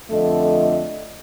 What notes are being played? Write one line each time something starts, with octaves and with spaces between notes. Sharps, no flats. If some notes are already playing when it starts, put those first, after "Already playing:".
F2 D3 A3 A4 D#5